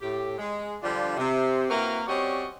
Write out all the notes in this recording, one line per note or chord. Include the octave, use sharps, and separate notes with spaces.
A2 G4
G#3
D3 F3 G3 D4 F4
C3
A#3 C4 E4 F#4 A#4 B4
G3 C4 C#4 F#4 D5 D#5